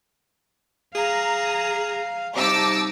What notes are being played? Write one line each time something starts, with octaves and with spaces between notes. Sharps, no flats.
G#4 F5 A#5
C3 G3 D#4 A5 D6 E6